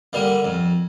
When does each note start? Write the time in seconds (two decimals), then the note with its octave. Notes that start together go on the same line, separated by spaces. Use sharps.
0.13 D3 G3 A#3
0.44 F2